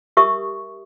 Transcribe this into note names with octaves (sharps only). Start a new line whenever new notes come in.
G4 A#4 E5 C#6 D#6